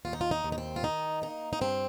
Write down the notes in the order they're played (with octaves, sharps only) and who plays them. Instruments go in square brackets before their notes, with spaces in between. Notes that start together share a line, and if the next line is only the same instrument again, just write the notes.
[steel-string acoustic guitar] D#2 F4
D#4
F4
D#4
D#2
D#4
C4
F4
D#3 D#4
A#3 D#4
D#4
G2 C4